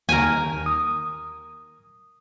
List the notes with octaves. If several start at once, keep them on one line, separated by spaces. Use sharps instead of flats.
D#2 A#4 G#5
D#6